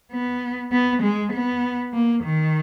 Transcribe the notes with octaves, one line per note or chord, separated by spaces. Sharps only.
B3
B3
G#3
B3
A#3
D#3